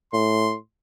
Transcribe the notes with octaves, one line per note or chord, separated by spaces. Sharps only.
A2 C6